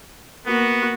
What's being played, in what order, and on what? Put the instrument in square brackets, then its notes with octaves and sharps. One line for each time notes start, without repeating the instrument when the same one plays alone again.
[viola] A#3 F#4 [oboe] B3